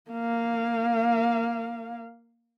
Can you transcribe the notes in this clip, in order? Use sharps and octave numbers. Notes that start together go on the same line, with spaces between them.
A#3 F5